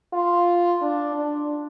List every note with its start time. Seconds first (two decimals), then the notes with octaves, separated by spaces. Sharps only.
0.13 F4
0.81 D4
1.16 D4